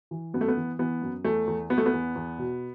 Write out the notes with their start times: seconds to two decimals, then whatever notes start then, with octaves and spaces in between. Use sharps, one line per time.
0.11 E3
0.34 F#2 B3
0.41 A3
0.48 B3
0.57 E3
0.79 E3 B3
1.02 F#2
1.24 E2 A3
1.47 E2
1.70 E2 B3
1.78 A3
1.86 B3
1.93 E2
2.15 E2
2.38 B2